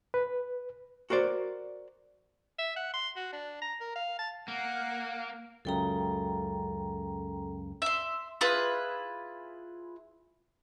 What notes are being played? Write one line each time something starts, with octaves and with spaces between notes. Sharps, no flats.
B4
F#4 A#4 C5 D5
E5
F#5
C6
F#4
D4
A#5
A#4
F5
A5
A#3 F#5
C#2 F#2 C#3 A4 G5 A#5
E5 C6
E4 F4 G#4 B4